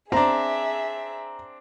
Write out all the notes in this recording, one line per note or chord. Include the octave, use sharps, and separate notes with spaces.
C4 D4 G#4 E5 A#5